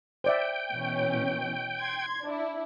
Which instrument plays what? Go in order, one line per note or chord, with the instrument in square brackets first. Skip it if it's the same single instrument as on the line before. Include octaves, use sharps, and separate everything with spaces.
[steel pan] C5 D5 E5 [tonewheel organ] G5
[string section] B2 E3 C#4
C6 G#6
D4 E4